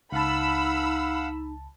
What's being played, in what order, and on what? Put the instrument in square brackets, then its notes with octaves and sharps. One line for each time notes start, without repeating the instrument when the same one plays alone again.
[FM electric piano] C#2 A5 [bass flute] D#4 [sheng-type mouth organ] F5 F#5 [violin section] B5 E6